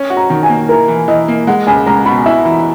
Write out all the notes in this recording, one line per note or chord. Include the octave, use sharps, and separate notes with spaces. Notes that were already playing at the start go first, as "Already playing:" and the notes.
Already playing: C#4
F#4
A#5
D#3
G#5
A#3
E4 A#4
E3
E3 D#5
A#3
G#3 F#5
C#2 G#5
C#2 A#5
B2 B5
E4 E5
E3